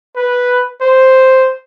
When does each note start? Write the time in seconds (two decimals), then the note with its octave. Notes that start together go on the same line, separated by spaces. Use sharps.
0.16 B4
0.82 C5